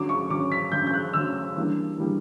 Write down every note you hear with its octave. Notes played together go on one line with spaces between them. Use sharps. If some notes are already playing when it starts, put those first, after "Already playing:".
Already playing: D3 F#3 C#4 D6
C#6
D3 F#3 C#4 D6
B6
D3 F#3 C#4 G6
G6
F#6
D3 F#3 C#4 E6
E3 G3 A#3 D4
E3 G3 A#3 D4